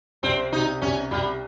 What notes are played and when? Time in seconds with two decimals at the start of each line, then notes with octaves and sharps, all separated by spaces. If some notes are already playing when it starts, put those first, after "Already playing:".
0.23 C2 C4
0.52 C3 D#4
0.82 C2 C#4
1.11 C2 G3